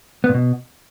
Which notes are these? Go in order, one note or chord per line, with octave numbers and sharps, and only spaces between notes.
B3
A#2
B2